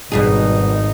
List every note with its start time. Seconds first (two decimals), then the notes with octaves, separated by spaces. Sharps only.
0.12 G#1 B2 G3 D#4 G#4